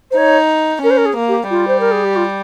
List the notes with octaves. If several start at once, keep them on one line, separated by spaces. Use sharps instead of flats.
C5
D#4 C#5
C#4 A#4
C5
A#4
G#4
A#3
G4
G3 F4
C5
A#4
G#4
G4
F4